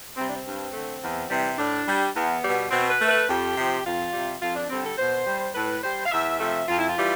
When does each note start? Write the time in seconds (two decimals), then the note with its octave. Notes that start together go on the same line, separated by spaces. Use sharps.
0.17 C3 G3 C4
0.27 D4
0.36 C4
0.45 G2
0.73 D3 A3
1.02 E2
1.30 C3 E3 G3
1.57 A2 D4
1.86 G3
2.14 E2 B3
2.43 B2 G3
2.71 B2 C4
2.91 B4
2.99 A3
3.09 B4
3.28 F2 G4
3.56 C3 F3
3.84 F2 F4
4.13 C3 G3
4.41 F2 F4
4.56 D4
4.70 D3 G3 C4
4.84 A4
4.98 B2 C5
5.26 G3
5.54 A2 B4
5.83 G3 C5
6.05 F5
6.11 E2 E5
6.40 C3 F3 A3 E5
6.68 F2 F4
6.78 E4
6.87 F4
6.97 E3 G3